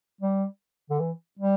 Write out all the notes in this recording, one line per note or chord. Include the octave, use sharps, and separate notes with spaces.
G3
D3
E3
G3